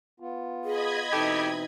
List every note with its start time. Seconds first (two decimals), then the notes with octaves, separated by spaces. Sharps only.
0.20 B3 F4
0.64 G#4 D#5 B5 G#6
1.12 B2 E3 C4 D#4 G4 A4